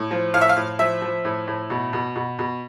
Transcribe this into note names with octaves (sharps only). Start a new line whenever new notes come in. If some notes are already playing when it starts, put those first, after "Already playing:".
Already playing: A2
F3
A2 F5
E5
F5
A2
F3 E5
F3
A2
A2
B2
B2
B2
B2